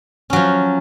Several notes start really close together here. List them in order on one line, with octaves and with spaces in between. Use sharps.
C#4 F#3 F3